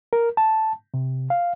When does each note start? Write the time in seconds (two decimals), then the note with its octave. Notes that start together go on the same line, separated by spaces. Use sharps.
0.13 A#4
0.37 A5
0.94 C3
1.30 F5